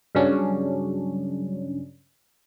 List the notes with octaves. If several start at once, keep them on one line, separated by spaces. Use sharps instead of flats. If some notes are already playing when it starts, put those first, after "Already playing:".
G2 C#3 F#3 C#4 D4